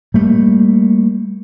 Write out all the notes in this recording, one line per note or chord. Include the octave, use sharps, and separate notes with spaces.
G3 A3 A#3